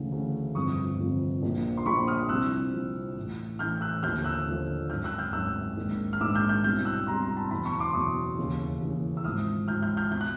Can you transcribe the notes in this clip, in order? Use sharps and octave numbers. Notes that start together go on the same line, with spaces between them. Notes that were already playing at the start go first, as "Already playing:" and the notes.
Already playing: D2 C#3 E3
D2 C#3 E3
G1 F2 C3 F3 C#6 D#6
G1 F2 C3 F3
A#1 A#2 F3
C6
A#1 A#2 F3 B5 C#6
D#6 F6
C2 C3 F3 E6 F#6
C2 C3 F3
A1 A2 E3
A1 A2 E3 F6 G6
E6 F#6
D#2 D3 F3 F6 G6
E6 F#6
D#2 D3 F3
G#1 F#2 D#3 F6 G6
E6 F#6
F6 G6
G#1 F#2 D#3 E6 F#6
A#1 G#2 D#3
F6
A#1 G#2 D#3 D6 E6
F6 G6
F6 G6
C2 B2 F6 G6
E6 F#6
C2 B2 A#5 C6
A#5 C6
A5 B5
F#1 E2 B2 A5 B5
B5 C#6
C6 D6
F#1 E2 B2 C#6 D#6
D#2 C#3 E3
D#2 C#3 E3
E6
G#1 G#2 F3 D#6 F6
G#1 G#2 F3 F6 G6
F6 G6
F6 G6
B2 G6
F#6